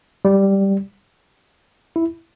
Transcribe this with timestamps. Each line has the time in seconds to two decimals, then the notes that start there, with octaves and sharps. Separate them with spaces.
0.25 G3
1.96 E4